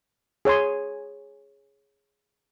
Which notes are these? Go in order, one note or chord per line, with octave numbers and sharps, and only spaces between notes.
G#4 C#5 G#5 C6